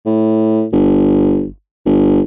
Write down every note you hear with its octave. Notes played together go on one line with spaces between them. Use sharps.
A2
G1
G1